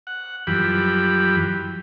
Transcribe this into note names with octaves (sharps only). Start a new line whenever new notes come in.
F#5
F#2 E3 F3 G3 G4 B5